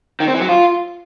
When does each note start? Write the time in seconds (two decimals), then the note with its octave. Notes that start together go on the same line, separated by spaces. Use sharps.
0.20 D#3
0.27 C4
0.34 E3
0.41 F#3
0.49 F4